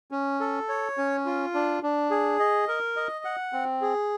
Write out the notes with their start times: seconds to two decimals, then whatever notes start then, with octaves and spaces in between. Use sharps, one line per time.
0.11 C#4
0.40 A4
0.69 C#5
0.98 C#4
1.26 F4
1.54 D4
1.83 D4
2.11 G#4
2.40 D#5
2.68 A#4
2.96 D#5
3.25 F#5
3.53 C4
3.82 G#4